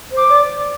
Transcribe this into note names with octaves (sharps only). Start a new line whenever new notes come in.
C5
D6
D5